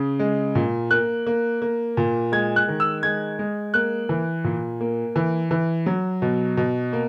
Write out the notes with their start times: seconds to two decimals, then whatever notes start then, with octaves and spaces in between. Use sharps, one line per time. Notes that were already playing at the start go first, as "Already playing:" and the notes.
Already playing: C#3
0.19 G#3
0.55 A#2
0.91 A#3 F#6
1.27 A#3
1.62 A#3
1.97 A#2
2.32 G#3 G#6
2.56 F#6
2.68 D#3
2.80 E6
3.03 G#3 G#6
3.39 G#3
3.74 A#3 F#6
4.09 E3
4.44 A#2
4.81 A#3
5.16 E3
5.51 E3
5.86 F#3
6.22 B2
6.57 B2
6.93 A#3